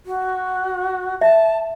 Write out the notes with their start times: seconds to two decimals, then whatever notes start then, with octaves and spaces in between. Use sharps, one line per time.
0.06 F#4
1.21 E5 A5